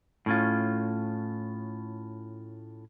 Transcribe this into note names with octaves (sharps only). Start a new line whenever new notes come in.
A2 C#4 F4